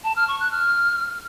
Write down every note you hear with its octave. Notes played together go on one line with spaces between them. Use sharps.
A5
F6
C#6
F#6
F6